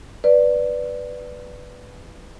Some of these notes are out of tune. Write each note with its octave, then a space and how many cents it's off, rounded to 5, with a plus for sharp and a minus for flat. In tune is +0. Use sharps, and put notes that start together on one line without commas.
B4 +0 D5 +0